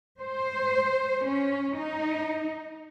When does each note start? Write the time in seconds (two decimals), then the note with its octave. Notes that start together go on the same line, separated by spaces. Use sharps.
0.21 C5
1.25 C#4
1.77 D#4